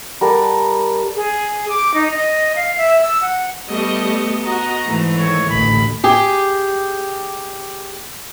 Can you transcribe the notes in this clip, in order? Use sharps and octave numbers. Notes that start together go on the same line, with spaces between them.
G3 A4 A#4 F#5
G#4
D6
D#4
D#5
F5
E5
E6
F#5
G3 A3 B3 D#5
F#4 D#5 A#5
G#2 E3 A3
D#3 C#5
A1 D2 A#2 B5
G4 G#4